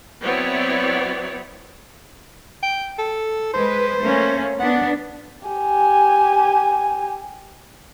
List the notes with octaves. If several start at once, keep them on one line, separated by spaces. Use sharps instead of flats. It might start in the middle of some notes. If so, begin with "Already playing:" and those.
F#3 B3 C4 E4 C#5 D5
G5
A4
G#3 B4 C5
A3 A#3 C#4
B3 D4 F#5
G4 G#5